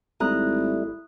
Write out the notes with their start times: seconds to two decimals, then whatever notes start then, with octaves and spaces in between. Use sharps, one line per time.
0.20 G#1 G3 A3 E4 A#5 D#6 F#6